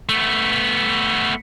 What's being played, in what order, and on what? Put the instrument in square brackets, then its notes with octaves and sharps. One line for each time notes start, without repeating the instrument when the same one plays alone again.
[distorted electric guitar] A3 B3